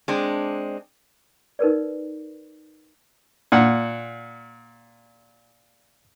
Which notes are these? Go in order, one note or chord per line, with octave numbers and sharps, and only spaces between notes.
G#3 C4 D4
D#4 A#4 B4 D5
A#2 F#5